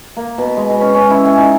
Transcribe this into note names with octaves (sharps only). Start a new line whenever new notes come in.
A#3
B2
G#3
B2
C#4
C#4
E4
G#5
D#4